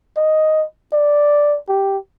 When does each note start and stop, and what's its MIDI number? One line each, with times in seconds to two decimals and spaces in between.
0.17 0.64 75
0.93 1.58 74
1.69 1.97 67